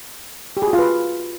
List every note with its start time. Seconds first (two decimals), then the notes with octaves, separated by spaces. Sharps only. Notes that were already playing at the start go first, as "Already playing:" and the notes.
0.57 G4
0.62 G#4
0.68 F#4
0.73 F4
0.79 B4